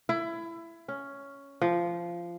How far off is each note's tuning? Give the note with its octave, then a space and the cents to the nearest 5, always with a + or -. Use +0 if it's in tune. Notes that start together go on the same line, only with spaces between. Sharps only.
E4 +20
C#4 +5
F3 -15